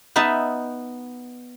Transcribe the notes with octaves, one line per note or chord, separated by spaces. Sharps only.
B3 D#4 E5 A5